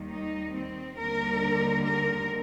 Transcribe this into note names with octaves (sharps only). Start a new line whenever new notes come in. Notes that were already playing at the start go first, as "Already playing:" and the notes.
Already playing: D#2 D#3 G3
D#4
C4
D#2 D3 G3 A#4
A#4